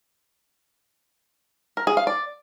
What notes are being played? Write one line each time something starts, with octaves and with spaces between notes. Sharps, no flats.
A#4
G#4
F5
D5